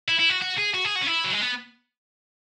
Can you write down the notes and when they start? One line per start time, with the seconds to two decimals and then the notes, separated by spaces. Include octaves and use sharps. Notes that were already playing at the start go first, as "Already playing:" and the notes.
0.08 E4
0.19 E4
0.29 F#4
0.41 F#4
0.58 G#4
0.74 F#4
0.85 G#4
0.96 F#4
1.02 C#4
1.07 E4
1.24 F#3
1.33 G#3
1.41 B3